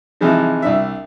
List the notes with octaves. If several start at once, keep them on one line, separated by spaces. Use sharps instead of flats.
C3 E3 F3 G#3 D#4
C2 D4 E5